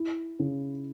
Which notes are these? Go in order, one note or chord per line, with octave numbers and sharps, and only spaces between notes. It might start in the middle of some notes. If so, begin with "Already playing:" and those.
Already playing: E4
C#3